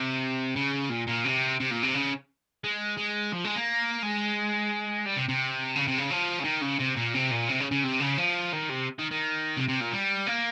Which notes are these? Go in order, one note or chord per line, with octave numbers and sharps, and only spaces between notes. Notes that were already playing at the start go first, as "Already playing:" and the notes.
Already playing: C3
C#3
A#2
A#2
C3
C3
A#2
C3
C#3
G#3
G#3
F3
G#3
A#3
G#3
G3
C3
C3
C#3
C3
C#3
F3
C#3
D#3
C#3
C3
A#2
C3
A#2
C3
C#3
C#3
C3
C#3
F3
D#3
C3
D#3
D#3
C3
C3
A#2
G3
A#3